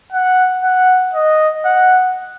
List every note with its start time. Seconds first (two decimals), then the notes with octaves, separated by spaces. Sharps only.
0.13 F#5
0.63 F#5
1.14 D#5
1.65 F#5